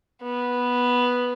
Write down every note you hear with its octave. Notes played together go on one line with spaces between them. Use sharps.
B3